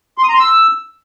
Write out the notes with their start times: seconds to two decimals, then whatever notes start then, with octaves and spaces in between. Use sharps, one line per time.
0.18 C6
0.23 D#6
0.29 A#5
0.34 C6
0.39 E6